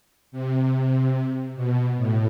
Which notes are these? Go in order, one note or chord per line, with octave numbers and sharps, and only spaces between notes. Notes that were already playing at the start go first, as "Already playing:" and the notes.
C3
B2
A2